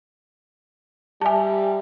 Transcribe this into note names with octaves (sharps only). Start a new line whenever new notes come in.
G3 G4 E5 G#5 A5